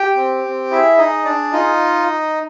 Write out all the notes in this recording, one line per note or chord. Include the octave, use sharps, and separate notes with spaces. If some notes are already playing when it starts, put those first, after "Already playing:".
Already playing: G4 G5
C4
C4
E4 G#4 E5
D#4 G#4 D#5
D4 D5
D#4 F4 D#5